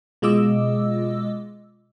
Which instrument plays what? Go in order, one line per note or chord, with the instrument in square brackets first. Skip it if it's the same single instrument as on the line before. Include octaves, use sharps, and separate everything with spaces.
[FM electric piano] B2 G#3 F4 D#5 D6 E6